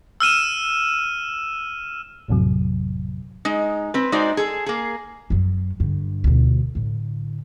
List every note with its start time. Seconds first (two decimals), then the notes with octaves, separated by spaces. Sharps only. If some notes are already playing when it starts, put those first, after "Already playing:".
0.20 E6 F6 D#7 E7
2.28 A1 F2 A2 C3 F#3
3.45 G#3 D#4
3.94 C4 B4
4.12 G#3 D#4 F#4 C5 D5
4.37 G#4 A4
4.66 A#3 G#4
5.30 F#2 F#3
5.80 G2 D3
6.24 D2 B2
6.75 A2 D3